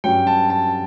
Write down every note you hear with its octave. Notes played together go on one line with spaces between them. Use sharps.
G2 F#3 C#4 G5
A5
A5